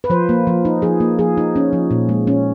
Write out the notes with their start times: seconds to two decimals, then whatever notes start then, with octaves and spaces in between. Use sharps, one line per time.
0.04 B4
0.10 F3 C5
0.29 A#3
0.47 F3
0.65 D#4
0.82 F3 G#4
1.00 A#3
1.19 F3 G#4
1.38 D#4
1.56 C#4
1.73 F3
1.91 A#2
2.09 G#3
2.27 C#4